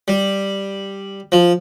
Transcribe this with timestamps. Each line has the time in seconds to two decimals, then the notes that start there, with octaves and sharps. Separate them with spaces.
0.08 G3
1.32 F3